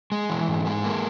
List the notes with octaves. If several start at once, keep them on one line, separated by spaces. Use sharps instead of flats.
G#3
E3
G#2
G#3
A#3